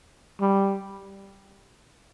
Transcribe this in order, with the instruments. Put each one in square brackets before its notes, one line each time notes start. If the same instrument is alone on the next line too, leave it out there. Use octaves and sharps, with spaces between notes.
[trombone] G3